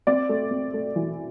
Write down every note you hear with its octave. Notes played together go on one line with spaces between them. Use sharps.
C4 D5
A3
C4
A3
E3